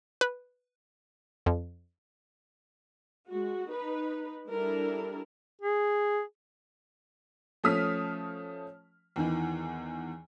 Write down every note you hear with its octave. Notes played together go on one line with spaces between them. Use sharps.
B4
F2
G#3 F#4
D#4 B4
G3 D4 E4 A4 A#4
G#4
F3 A3 C#4 D#6 F6 B6
E2 D#3 E3